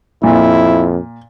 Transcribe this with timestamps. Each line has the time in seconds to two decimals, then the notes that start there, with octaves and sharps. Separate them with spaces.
0.23 F2 A#2 E4